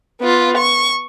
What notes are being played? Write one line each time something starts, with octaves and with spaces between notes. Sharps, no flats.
B3 F4
C#6